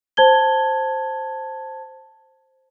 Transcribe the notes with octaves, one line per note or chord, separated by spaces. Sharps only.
C5 A5 G#6 G7